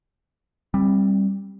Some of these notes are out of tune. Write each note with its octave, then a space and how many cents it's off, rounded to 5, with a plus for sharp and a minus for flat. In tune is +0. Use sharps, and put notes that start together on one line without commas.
G3 +5 C4 +30